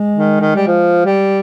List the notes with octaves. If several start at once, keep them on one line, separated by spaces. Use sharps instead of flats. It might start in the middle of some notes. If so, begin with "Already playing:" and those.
Already playing: G#3
D#3
D#3
G3
F3
G3